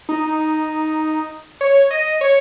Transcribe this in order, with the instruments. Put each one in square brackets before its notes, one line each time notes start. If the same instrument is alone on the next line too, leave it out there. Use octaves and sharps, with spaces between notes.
[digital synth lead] D#4
D#4
C#5
D#5
C#5